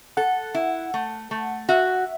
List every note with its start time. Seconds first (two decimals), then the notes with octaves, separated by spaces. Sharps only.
0.17 A4 F#5
0.54 E4
0.94 A3
1.31 A3
1.69 F#4 E5